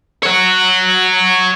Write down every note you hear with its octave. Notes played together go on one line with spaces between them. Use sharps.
C#5 F#5